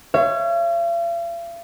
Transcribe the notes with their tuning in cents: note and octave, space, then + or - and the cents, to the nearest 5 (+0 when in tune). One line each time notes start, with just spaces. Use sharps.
C#5 +0 F5 -45